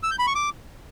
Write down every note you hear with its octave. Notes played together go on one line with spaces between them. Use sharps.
E6
G6
B5
C#6
D6